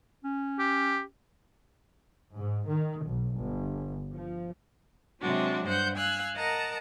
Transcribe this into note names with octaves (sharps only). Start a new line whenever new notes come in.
C#4
G4
G#2
D#3
B1
G1
F3
C3 F#3 G#3 D4 F#4
G2 C5 F#5 G6
F5 G#5 E6 F#6
A#4 D#5 F#5 A5 A#5